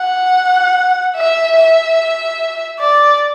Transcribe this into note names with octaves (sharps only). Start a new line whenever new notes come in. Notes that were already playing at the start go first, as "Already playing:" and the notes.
Already playing: F#5
E5
E5
D5